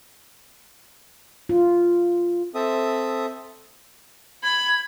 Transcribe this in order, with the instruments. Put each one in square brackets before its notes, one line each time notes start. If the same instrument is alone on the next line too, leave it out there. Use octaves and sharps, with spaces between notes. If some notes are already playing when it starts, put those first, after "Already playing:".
[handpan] F4
[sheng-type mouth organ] C4 A4 E5 D#6
[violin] B5 [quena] G#6